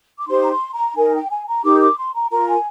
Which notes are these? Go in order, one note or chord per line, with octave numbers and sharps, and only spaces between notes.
D6
D#4 G4 C5 C6
A#5
C6
A#5
D#4 A#4 G#5
G5
G#5
A#5
D#4 G4 A#4 D6
D6
C6
A#5
F4 A#4 A#5
G#5